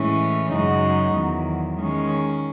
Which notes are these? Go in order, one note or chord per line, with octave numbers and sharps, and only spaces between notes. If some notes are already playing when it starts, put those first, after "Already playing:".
Already playing: A2 E3 G#3 C#4
F#2 C#3 G#3 D#4 F#4
E2 D#3 F#3
D#3 G#3 C#4